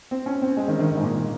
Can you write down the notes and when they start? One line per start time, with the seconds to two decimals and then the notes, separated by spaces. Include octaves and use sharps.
0.11 C4
0.26 C#4
0.42 C4
0.57 G#3
0.68 D#3
0.79 D#3
0.91 D#3
0.98 G#2
1.03 A#2